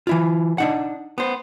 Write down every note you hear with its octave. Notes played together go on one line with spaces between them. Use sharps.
E3 E4 F4
D4 D#4 F#5
B3 C5